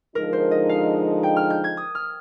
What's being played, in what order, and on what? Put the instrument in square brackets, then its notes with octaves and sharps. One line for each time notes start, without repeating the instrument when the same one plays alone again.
[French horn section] D3 F3 G#3 D#4 [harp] A#4
[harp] C5
D#5
F5
G5
F6
G6
G#6
D#6
F6